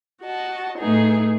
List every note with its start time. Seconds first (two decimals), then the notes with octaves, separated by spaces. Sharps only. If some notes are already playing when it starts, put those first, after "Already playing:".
0.23 F#4 D#5 A5
0.78 A2 A3 B3 D#4 G#4